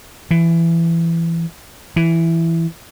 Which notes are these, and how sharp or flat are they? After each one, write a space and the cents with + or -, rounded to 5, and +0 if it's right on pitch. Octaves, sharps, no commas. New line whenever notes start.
E3 +20
E3 +5